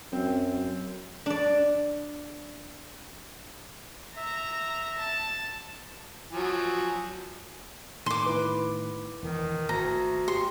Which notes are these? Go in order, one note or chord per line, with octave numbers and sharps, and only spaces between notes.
F#2 C4
D4 D5
E5 A#5
A5
F3 F#3 G#5
A2 D#3 C6 D6
E4 B4
E1 D#3 E3
G#1 D2 A#5
G4 C6